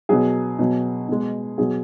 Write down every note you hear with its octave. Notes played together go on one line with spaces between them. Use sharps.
B2 F#3 G#4
B2 F#3
B2 G#3
B2 F#3 G#4